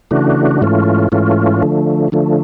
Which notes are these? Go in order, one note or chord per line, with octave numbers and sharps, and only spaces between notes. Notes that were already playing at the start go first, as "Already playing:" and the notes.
C#3 E3 A3 D4 F#4
G#2 E3 A3 C#4 F4
G#2 E3 A3 C#4 F4
D3 F3 A3
D3 F3 A3